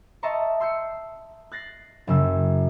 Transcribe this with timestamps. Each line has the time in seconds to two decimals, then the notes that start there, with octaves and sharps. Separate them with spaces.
0.23 D#5 E5 A5 A#5 C6 C#6
0.60 C6 E6 G6 C7 C#7
1.52 F#6 A6 A#6 C7
2.07 F#1 F#2 C#3 E6